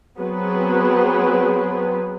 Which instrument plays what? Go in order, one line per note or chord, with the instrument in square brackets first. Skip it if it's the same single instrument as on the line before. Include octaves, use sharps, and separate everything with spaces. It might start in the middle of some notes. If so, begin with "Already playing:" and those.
[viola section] F#3 B3 C4 G#4 B4